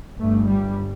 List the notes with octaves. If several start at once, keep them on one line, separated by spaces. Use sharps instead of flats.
G1 G2 A3
G3